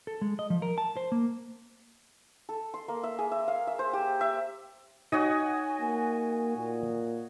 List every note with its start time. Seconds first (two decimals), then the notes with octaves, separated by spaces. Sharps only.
0.07 A4
0.22 G#3
0.39 D#5
0.50 F3
0.62 A#4
0.78 A5
0.97 C5
1.12 A#3
2.49 A4
2.74 C6
2.88 A#3
3.04 E5
3.19 G#4
3.32 E5
3.48 F5
3.67 E5
3.79 C5
3.93 G4
4.21 E5
5.12 D#4 F#4 C#5 D#5 G#5
5.81 A#3
6.57 A#2